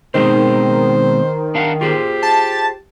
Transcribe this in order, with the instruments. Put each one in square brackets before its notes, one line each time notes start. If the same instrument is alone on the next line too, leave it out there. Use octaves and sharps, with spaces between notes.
[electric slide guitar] B2 G#3 C4 [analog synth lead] D#3 [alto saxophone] C5
[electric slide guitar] D4 F5 F#5
[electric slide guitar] F4 G#4 C5 [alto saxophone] G4
[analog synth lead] A5